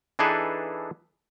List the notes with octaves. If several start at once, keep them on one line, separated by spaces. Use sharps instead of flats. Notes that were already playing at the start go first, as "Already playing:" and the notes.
E3 D4 D#4 G#4 A4 B4